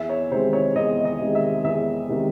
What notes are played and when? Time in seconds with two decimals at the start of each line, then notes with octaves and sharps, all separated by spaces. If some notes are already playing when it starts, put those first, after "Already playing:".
Already playing: E2 E5
0.09 C#5
0.31 C3 D#3 G#3 C5
0.53 C#5
0.75 E2 D#5
1.05 D#5
1.20 C3 D#3 G#3
1.35 E5
1.64 E2 E5
2.09 C3 D#3 G#3